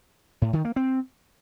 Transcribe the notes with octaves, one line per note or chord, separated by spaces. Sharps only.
A2
D#3
A#3
C4